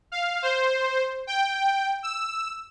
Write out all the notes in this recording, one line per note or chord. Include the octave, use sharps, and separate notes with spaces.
F5
C5
G5
E6